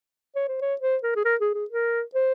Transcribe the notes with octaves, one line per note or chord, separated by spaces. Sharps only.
C#5
C5
C#5
C5
A#4
G#4
A#4
G#4
G#4
A#4
C5